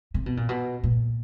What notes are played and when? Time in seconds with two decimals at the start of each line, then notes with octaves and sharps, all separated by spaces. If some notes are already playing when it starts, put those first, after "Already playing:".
0.14 C3
0.26 B2
0.37 A#2
0.49 B2
0.83 A#2